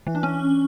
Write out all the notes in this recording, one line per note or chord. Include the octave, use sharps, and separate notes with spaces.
E3
D4
C#4